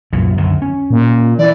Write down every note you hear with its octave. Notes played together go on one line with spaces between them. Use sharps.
C2 F#2 A#2
F#2 D3 D#3
C#4
A#2
E3 D5